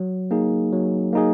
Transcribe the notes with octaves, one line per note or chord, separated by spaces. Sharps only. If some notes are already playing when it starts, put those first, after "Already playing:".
Already playing: F#3
A#3 D#4 G#4
F#3
A#3 D#4 G#4